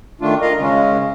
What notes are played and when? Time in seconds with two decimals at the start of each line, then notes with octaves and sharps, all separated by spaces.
0.21 D#3 A3 D4 F4
0.42 F4 A#4 D#5 F5
0.60 C#3 G#3 C#4